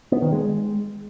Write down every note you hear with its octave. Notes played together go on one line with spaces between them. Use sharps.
B3
D#3
G#3